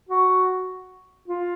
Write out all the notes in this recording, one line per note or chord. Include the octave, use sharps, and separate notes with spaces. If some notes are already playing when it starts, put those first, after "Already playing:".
F#4
F4